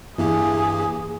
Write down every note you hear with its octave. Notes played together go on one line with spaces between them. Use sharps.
G2 E3 A#3 G4 G#4